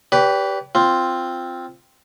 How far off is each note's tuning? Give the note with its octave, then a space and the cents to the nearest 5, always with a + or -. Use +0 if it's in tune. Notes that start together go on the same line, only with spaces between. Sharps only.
G4 +0 B4 +0 D5 -40
C4 +0 F4 +0